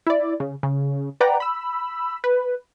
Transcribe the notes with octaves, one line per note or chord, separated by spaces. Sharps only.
E4 D5
C#3
C#3
B4 D5 F#5 G5 A#5
B5 E6
B4